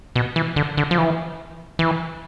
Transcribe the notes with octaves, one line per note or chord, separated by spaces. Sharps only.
B2
E3
D3
D3
F3
E3
E3